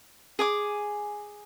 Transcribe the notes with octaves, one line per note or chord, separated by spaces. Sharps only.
G#4 G#5 D6